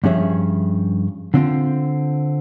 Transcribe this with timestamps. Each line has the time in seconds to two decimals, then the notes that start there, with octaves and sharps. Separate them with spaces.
0.04 G2 F3 C#4 G#4 E5
1.34 D3 C4 F4